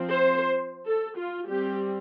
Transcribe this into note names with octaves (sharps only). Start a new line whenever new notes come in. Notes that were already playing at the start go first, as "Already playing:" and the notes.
Already playing: F3 C4
C5
A4
F4
G3 C4 G4